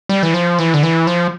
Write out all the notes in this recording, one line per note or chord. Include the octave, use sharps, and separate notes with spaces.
G3
E3
F3
E3
D3
E3
F3